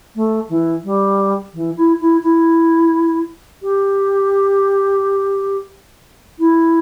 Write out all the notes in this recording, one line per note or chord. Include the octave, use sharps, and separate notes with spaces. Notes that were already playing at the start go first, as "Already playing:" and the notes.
A3
E3
G3
E3
E4
E4
E4
G4
E4